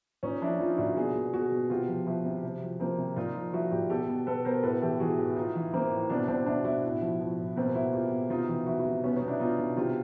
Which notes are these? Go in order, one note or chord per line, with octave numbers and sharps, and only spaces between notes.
A#2 C#4 D#4
F3 D4 E4
F3 D#4 F4
A#2 E4 F#4
B2 F#4 G#4
B2
B2 F#4 G#4
B2
C3 F4 G4
F3
F3 E4 F#4
C3
C3
F3
F3 A#3 C4
C3
A#2 D#4 F4
F3
F3 E4 F#4
A#2 F4 G4
B2 G4 A4
B2
B2 A4 B4
B2 A#4 C5
A2 A4 B4
E3 G4 A4
E3 F#4 G#4
A2
A2 D#4 F4
E3
E3 A#3 C4
A2
B2 C4 D4
B2 C4 D4
B2 D4 E4
B2 E4 F#4
A2
F3
F3
A2
B2 A#3 C4
B2 E4 F#4
B2 F4 G4
B2
C3 D#4 F4
E3 F4 G4
E3 E4 F#4
E4 F#4
C3
B2 B3 C#4
C#4 D#4
B2
D4 E4
B2 D#4 F4
B2
C3 F4 G4